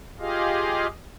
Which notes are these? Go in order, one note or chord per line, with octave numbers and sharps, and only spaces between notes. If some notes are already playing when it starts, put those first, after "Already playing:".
F4 G4 G#4 D#5 F5